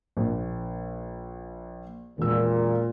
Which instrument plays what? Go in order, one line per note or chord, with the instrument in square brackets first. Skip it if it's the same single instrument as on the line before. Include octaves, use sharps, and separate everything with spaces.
[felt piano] A#1
[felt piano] E1 E6 [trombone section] A#2